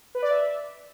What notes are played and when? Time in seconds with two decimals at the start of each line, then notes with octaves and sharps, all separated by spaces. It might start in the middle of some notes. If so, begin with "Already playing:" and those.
0.15 B4
0.22 D5
0.30 E5